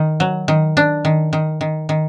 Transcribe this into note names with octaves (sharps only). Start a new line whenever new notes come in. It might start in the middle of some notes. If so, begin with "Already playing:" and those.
Already playing: D#3
F#3
D#3
D4
D#3
D#3
D#3
D#3